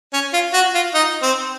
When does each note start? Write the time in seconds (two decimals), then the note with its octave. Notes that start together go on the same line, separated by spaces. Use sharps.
0.13 C#4
0.33 F4
0.54 F#4
0.75 F4
0.95 D#4
1.23 C4